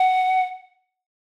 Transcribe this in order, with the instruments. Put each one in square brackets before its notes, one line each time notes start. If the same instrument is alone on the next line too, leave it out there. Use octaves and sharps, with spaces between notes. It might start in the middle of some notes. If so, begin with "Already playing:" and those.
Already playing: [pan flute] F#5